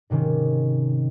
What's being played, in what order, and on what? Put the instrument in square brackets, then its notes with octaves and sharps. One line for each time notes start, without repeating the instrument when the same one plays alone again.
[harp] G#2 C3 D#3 C#4